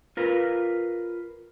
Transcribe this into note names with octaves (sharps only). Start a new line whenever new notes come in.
F4 A#4 B4